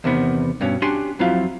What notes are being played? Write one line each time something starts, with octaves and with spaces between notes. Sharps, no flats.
E2 C3 D#3 B3
G2 B2 C#4
C#4 D4 F#4 G4 G#5 C6
F2 F#3 C4 E4 F4 F5